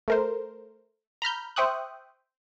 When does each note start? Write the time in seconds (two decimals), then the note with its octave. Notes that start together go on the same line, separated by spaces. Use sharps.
0.08 A3 A#4 C5
1.22 A#5 B5 F6 G6
1.56 C5 E5 G5 C#6 D#6 F#6